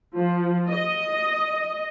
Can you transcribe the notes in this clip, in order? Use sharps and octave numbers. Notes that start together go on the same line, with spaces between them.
F3
D#5